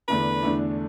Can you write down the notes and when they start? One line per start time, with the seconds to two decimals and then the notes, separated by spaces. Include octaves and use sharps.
0.08 E2 D3 A3 D4 B4
0.43 E2 D3 A3 D4